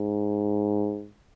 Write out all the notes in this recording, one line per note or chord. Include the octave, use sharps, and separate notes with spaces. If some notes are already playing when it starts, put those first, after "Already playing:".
Already playing: G#2